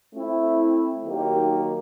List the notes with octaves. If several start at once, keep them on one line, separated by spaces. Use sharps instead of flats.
A3 C4 E4
D#3 F#3 A#3 D#4 G4